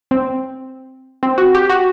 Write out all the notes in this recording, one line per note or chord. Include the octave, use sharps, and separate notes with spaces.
C4
C4
F#4
G4
F#4